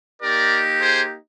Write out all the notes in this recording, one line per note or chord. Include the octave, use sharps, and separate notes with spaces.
A#3 D#4 G4 A#4 D5
G#4 C5